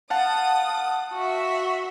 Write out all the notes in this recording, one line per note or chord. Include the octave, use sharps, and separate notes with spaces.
F5 F#5 A5 D#6
F#4 E5